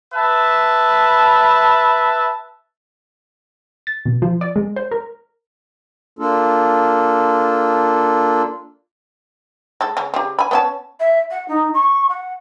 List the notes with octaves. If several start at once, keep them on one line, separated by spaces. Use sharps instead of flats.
B4 E5 A5
A6
B2
F3
D5
G#3
C5
A#4
A#3 D4 F4 A4
G#3 A4
C#3
C#3 G4
G#5 B5
B3 C#4 A5
E5
F#5
D#4
C#6
F#5